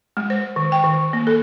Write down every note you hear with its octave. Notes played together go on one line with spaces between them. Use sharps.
G#3
C5
D#3
G5
D#3
A#3
A4